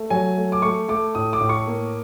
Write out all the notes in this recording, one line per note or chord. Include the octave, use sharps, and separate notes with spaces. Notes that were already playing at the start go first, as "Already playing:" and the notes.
Already playing: A3
F#3 G#5
A3
D6
A3 C#6
A3 D6
A2 D#6
D6
A2
C#6
A#3